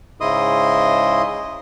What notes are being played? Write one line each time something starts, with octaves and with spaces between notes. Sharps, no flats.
G#2 C#3 E4 D#5 C6 D#6